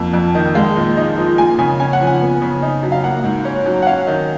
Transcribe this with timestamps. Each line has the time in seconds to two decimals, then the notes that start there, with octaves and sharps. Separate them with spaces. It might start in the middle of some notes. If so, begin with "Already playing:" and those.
Already playing: F2 A#3
0.13 F2
0.35 D#3
0.55 G#3 F5
0.76 A#2
0.97 D#4
1.18 F3
1.38 A#3 G#5
1.58 C#3 G#5
1.80 C#4 G#5
1.93 F#5
2.00 F3
2.07 G#5
2.21 B3
2.42 C#3
2.62 D#4
2.83 F#3
2.92 F5
3.03 A#3 F#5
3.24 G#2
3.45 C#4
3.66 F#3
3.83 F#5
3.87 C#4 F5
4.07 D#3